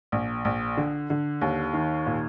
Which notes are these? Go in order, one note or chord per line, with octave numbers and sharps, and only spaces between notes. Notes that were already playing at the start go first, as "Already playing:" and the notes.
A#1
A#1
D3
D3
D#2
D#3
A#2